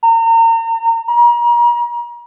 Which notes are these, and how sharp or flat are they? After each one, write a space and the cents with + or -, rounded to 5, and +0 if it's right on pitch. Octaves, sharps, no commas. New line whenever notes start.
A#5 -35
A#5 +40